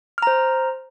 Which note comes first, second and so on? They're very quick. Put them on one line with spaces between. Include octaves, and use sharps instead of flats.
F6 A#5 C5